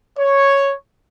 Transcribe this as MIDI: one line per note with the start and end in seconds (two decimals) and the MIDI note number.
0.18 0.74 73